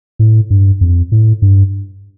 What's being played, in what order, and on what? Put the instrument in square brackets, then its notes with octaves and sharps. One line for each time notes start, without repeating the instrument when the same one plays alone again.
[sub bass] A2
G2
F2
A2
G2